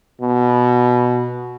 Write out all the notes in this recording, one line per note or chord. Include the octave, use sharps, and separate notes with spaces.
B2